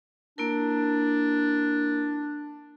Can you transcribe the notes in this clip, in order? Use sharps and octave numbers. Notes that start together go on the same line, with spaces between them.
A#3 D4 E4 A#4